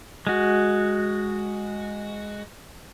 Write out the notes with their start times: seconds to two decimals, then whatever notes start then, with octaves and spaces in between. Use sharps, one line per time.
0.27 G#3 F#4